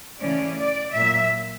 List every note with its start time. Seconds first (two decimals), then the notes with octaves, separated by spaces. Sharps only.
0.20 C#3 E3 A3 C#4 D5
0.57 D5
0.93 A#2 F#3 A#3 E5